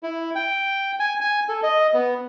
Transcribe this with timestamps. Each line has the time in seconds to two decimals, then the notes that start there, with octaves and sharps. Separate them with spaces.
0.03 E4
0.35 G5
1.00 G#5
1.21 G#5
1.49 A4
1.63 D#5
1.94 B3